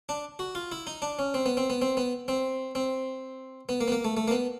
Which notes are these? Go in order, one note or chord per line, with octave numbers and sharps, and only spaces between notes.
D4
F#4
F4
E4
D#4
D4
C#4
C4
B3
C4
B3
C4
B3
C4
C4
B3
A#3
B3
A#3
A3
A3
A#3
B3